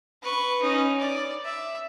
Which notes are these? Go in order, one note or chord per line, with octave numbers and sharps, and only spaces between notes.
B4 C#6
C#4 D#4
D5
E5